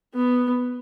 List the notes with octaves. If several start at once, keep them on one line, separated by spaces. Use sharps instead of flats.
B3